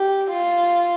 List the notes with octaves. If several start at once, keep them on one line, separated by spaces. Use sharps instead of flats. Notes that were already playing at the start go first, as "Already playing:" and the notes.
Already playing: G4
F4